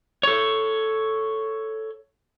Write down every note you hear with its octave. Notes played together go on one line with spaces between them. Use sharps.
A4 C#5